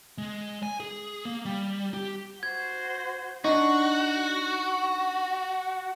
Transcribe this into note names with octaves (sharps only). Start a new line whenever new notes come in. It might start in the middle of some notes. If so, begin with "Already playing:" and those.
G#3
G#5
G#4
A#3
G3
G4
F#4 C5 G#6
D4 D#4 F#4